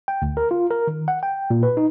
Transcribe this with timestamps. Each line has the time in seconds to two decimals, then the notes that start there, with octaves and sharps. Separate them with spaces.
0.08 G5
0.22 D2
0.37 A#4
0.51 F4
0.71 A#4
0.87 D#3
1.08 F#5
1.23 G5
1.50 A#2
1.63 B4
1.77 D#4